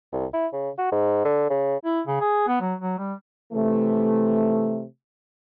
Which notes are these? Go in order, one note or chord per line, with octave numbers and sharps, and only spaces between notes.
C2
E4
C#3
F#4
G#2
D3
C#3
E4
C#3
G#4
B3
F#3
F#3
G3
C3 E3 A3